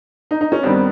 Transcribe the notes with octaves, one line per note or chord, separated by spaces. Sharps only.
D#4
D#4
C#4
G2 D#3 G3 B3 C4 D4